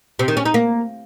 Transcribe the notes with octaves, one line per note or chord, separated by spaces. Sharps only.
C3
D#3
C#4
D#4
A#3